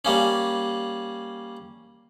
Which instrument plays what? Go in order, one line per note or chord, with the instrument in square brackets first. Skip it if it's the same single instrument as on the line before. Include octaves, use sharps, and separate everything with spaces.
[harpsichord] G3 A#3 C#4